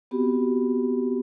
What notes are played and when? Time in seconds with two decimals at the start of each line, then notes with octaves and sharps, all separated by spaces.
0.11 B3 C4 F#4 G4